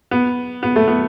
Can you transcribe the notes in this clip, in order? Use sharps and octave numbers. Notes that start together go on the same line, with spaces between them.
B3
B3
A3
B3